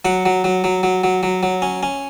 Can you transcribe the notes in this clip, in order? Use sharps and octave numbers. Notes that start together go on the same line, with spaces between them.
F#3 F#5
F#3
F#3
F#3
F#3
F#3
F#3
F#3
C#4
C#4